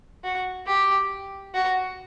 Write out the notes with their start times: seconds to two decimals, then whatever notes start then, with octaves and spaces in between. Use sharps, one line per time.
0.24 F#4
0.67 G4
1.54 F#4